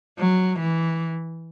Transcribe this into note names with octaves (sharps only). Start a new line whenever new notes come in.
F#3
E3